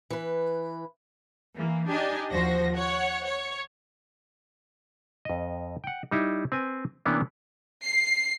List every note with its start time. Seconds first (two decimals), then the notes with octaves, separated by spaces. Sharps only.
0.10 E3 B4
1.57 E3 A#3
1.88 D4 D#4 G4 D#5 G#5
2.30 D#2 F3 F#4 C5 A#6
2.75 C#5 F#5
3.25 C#5
5.25 F2 D#5
5.84 F#5 G5
6.11 G3 D#4 E4
6.52 C4 B4 G#5
7.06 C3 E3 A#3 B3 C#4 D4
7.84 C7